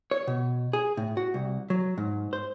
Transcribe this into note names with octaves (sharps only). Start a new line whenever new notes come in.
C#5
B2
G#4
A2
F#4
C2
F#3
G#2
C5